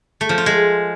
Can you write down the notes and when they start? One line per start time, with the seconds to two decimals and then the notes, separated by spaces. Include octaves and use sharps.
0.21 A3
0.29 F3
0.38 F4
0.46 G#3